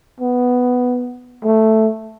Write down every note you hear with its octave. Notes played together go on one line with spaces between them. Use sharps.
B3
A3